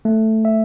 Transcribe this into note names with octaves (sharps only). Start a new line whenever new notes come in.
A3
E5